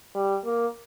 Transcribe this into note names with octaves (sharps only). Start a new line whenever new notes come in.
G3
A#3